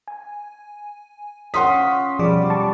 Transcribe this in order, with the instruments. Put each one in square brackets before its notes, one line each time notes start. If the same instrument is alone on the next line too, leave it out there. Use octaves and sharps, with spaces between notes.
[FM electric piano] G#5
[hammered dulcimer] C#4 F4 [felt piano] F#5 C6 D#6 [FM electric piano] B6
[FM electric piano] B2 F3 G#4 [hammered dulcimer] G3 D5
[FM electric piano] A5 C#6 D6